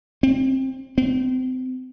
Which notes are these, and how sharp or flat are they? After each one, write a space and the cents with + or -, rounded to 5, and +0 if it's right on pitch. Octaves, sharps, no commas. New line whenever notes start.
C4 +20
C4 -35